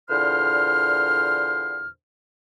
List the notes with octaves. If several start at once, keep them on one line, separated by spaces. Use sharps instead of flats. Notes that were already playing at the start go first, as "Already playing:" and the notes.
E2 A#2 D3 C5 F6